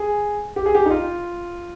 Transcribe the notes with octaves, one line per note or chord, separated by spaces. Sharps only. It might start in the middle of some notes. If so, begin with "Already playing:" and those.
Already playing: G#4
G4
G#4
G4
D#4
F4